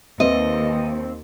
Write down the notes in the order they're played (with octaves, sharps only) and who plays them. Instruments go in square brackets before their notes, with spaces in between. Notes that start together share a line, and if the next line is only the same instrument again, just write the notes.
[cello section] D#2 [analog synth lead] C4 [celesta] B4 C6 [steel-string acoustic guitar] D#5